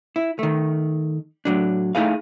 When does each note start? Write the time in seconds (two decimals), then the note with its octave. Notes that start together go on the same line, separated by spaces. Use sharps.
0.16 E4
0.39 D#3 A3
1.45 A2 F#3 D4
1.95 A3 D#4 E4 G#4 F5